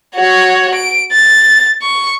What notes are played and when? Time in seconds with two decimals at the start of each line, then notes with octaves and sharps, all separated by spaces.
0.15 F#4 C#5
0.74 D7
1.12 A6
1.82 C#6